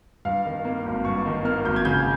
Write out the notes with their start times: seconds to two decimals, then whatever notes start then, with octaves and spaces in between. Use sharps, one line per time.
0.25 G2 F5
0.45 D#3
0.65 A#3
0.86 G#1
1.05 G2 C#6
1.25 D#3
1.45 A#3 F6
1.65 G#1 G6
1.76 G#6
1.85 C#3 G6